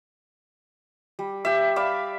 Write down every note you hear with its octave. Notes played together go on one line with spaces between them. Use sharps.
G3
G4 E5
D5 E5 F5 B5